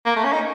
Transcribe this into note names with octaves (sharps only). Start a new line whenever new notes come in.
A#3
A3
C#4
D#4